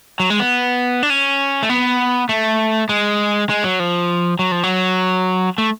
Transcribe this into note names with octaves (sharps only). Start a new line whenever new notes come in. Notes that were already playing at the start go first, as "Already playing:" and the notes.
F#3
G#3
B3
D4
C#4
A3
B3
A3
G#3
G#3
F#3
F3
F#3
F3
F#3
A3